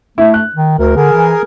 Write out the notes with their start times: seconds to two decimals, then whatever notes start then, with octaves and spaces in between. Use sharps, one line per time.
0.18 A3 E4
0.34 F#6
0.56 D#3
0.79 D2 A#4
0.96 D3 G#4 A#4
1.12 E3